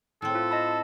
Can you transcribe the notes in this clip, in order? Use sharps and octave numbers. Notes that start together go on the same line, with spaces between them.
A2 C4 A4
F4
D#5 A5 B5